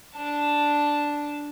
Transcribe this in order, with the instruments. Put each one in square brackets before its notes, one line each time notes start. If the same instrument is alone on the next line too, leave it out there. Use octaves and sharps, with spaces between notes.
[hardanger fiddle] D4 A5